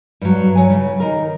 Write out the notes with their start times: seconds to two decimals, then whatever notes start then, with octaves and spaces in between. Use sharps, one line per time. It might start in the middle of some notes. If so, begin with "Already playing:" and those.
0.21 G2 F#3
0.55 F#3 G#5
0.70 C#3
1.00 D#3 A#4